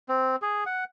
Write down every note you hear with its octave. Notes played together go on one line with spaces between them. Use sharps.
C4
G#4
F#5